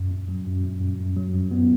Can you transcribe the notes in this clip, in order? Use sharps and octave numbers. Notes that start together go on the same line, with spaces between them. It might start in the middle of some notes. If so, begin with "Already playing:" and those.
Already playing: F#2
F#2
F#3
F#2
F#2
F#2
F#2
F#3
F#2
B3